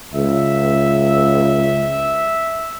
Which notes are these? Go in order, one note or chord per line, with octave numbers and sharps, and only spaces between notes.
C#2 E5